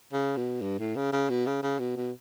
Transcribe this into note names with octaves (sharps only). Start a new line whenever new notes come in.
C#3
B2
G2
A2
C#3
C#3
B2
C#3
C#3
B2
B2